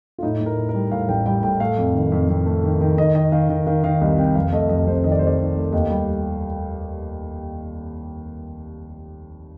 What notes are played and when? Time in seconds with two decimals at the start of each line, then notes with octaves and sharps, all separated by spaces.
0.18 F4
0.23 A2 D#4
0.40 A2
0.46 A#4
0.57 A2
0.69 A#4
0.74 G3
0.91 A2 F5
1.09 A1 G5
1.26 G3 G5
1.43 A2 G5
1.60 A3 F5
1.77 F2
1.95 D#3
2.12 F2
2.29 F2
2.46 A3
2.64 D#3
2.81 D#3
2.98 D#3 D#5
3.15 D#3 D#5
3.32 D#3 F5
3.50 D#3
3.66 D#3 F5
3.84 D#3 F5
4.01 C2 D#5
4.18 C3 G5
4.35 F1 F5
4.52 A3 D#5
4.69 F2 D#5
4.87 F2 C5
5.04 D#3 D#5
5.12 D5
5.19 F2 C5
5.27 D5
5.38 D#3
5.56 A3
5.73 D#2 D#5
5.90 G3